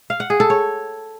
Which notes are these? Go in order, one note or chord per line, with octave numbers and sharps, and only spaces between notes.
F5
F#5
G#4
A4
C#5